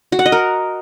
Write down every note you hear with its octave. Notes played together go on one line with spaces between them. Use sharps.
F#4
F#5
D#5
A#4